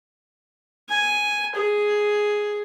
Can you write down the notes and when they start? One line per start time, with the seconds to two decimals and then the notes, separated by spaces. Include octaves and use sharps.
0.89 G#5
1.55 G#4